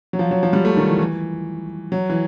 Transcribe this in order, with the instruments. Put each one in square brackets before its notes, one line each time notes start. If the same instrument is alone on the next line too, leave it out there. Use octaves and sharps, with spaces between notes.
[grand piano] F#3
F3
F#3
F3
G3
A3
D#3
E3
E3
F#3
E3